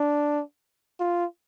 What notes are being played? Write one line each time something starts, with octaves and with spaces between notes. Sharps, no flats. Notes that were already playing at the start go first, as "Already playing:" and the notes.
Already playing: D4
F4